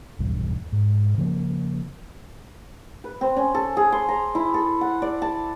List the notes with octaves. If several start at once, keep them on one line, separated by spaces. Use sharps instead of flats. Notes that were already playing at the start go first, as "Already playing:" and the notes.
D#1 B1 E2 G2
G#2
C#3 F3 G#3 A#3
B4
C4
C#4
A4
G#4
C6
A#5
E4
A4
F#5
D5
A5